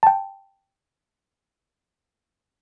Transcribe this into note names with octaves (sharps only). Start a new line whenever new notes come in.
G5 A5